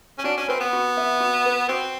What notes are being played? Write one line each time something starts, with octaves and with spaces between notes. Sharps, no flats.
C#4
D4 F#4
C#4
C4 B4
B3
F#4
E5
F#4
B4
C4 F#4